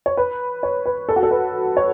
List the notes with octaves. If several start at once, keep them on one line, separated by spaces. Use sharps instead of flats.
C#5
B4
C#5
B4
A4
F#4
A4
B4
C#5